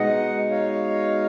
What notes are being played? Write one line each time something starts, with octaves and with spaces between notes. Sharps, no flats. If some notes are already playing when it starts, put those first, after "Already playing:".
Already playing: B2 G#3 D#4 D#5 F#5
C#5 F5